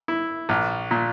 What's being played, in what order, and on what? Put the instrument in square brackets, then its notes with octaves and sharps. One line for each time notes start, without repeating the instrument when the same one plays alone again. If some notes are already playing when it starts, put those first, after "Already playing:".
[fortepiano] E4
A#1
A#2